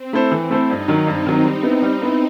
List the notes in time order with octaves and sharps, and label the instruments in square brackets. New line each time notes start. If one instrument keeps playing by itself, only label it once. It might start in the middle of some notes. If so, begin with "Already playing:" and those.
Already playing: [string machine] C4
[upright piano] A3 E4 A4 C5
E3
A3 E4 A4 C5
[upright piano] G2 [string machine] D#4
[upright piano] D#3 F#3
[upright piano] G2 [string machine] C4
[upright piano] D#3 F#3
G3
B3 E4
G3
B3 E4